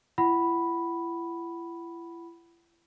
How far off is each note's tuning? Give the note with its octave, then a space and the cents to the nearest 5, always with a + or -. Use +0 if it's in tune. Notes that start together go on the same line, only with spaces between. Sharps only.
E4 +40 F#5 +25 B5 +0